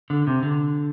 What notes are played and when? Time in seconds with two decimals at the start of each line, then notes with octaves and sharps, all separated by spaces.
0.10 D3
0.27 C3
0.43 D3